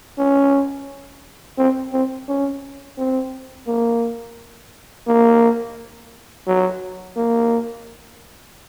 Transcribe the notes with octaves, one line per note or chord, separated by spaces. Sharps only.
C#4
C4
C4
C#4
C4
A#3
A#3
F#3
A#3